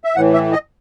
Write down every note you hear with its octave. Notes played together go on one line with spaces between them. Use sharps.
E5
A2 E3 F#5
E5
D#5